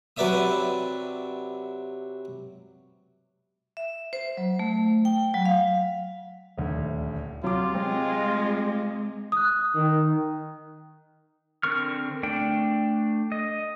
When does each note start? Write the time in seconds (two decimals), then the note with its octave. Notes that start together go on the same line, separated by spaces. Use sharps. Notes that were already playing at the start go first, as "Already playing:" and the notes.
0.17 C3 F#3 B4 D5 E5 D#6
3.77 E5
4.13 C5
4.37 F#3
4.59 A3
5.05 G5
5.34 F#3
5.46 F5
6.58 D#1 D2
7.44 C3 F#3 F4 D6
7.75 G#3 C4
9.32 D#6 F#6
9.75 D#3
11.63 D3 C4 A#4 C#6 F6
12.23 A3 D4 G5
13.32 D#5